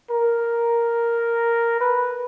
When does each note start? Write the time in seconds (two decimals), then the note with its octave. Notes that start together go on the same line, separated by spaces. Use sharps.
0.10 A#4
1.80 B4